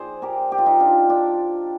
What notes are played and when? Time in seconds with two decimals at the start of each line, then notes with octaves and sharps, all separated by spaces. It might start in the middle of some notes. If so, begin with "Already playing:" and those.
Already playing: G#4 C5 D5
0.22 G4 A#4
0.52 G4
0.58 F4
0.66 D#4 G4
0.80 D4 F4
1.10 D4